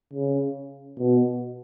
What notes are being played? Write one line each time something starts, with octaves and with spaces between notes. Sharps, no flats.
C#3
B2